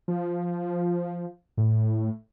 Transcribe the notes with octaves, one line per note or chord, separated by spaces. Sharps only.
F3
A2